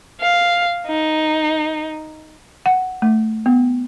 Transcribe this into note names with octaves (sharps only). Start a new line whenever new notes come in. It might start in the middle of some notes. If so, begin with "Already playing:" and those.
F5
D#4
F#5
A3
B3